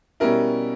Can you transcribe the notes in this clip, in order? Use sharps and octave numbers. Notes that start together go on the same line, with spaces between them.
B2 G3 C#4 E4 A#4